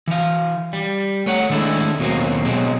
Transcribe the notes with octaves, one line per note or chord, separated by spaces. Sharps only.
E3 F5
G3
A3 C#5 F#5
D#3 G#3 A3 D4 E4
D#2 B2 F#3 A#3 C4
B2 F#3 G#3 C4